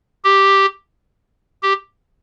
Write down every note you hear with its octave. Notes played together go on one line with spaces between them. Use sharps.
G4
G4